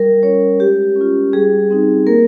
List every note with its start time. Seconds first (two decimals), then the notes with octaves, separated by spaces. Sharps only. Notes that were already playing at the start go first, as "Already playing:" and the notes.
Already playing: G3 A#4
0.22 C#4 F4 C#5
0.60 G#3 G4
0.96 C#4
1.01 F4
1.33 G3 G#4
1.70 C4 D#4
2.07 A#3 A#4